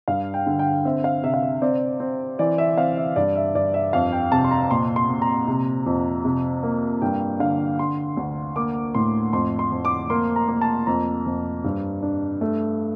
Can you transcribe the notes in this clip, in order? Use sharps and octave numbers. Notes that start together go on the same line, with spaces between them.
G2 F5
G5
D3
G5
C4 E5
F5
C3 E5
F5
E5
C4 D5
C4
E3 D5
E5
C4 F5
E5
G2 D5
E5
G2 D5
E5
F2 F5
G5
C3 A5
C6
A#5
A#2 C6
C6
A#2
A#5
C3
F2
C3
A#3
G2 G5
D3 F5
D3 C6
D2
A#3 D6
A2 C6
F2 C6
C6
F2
D6
A#3 C6
A#5
A#3
A5
F2 A#5
F2
G2
D4
A3